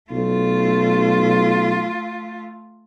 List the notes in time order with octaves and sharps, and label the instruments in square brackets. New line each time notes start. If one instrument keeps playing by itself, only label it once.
[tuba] B1 [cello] A3 F4